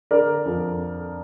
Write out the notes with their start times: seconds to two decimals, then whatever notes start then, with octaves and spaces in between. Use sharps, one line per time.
0.11 D3 A#4 D5
0.45 F2